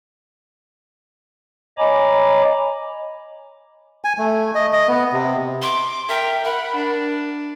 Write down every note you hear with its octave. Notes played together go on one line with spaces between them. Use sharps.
C#5 D#5 G#5 A#5 B5 D6
G#5
A3
D#5
D#5
B3
C3
C6 D6
A#4 E5 G5
A#4 F#5 B5
D4